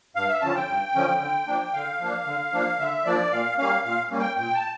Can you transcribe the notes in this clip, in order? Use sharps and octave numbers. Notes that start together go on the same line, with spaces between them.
G2 F5
E5
D3 F3 C#4 A5
G5
G2
D3 F3 C#4
D3
F3 A#3 D4
D3 F5
F3 A#3 D4
D3
F3 A#3 D4
D3 E5
F3 A#3 D4 D5
A#2 F5
G3 A#3 C#4 F5
A#2 F5
G3 A#3 C#4
G5
A#2 G5
A5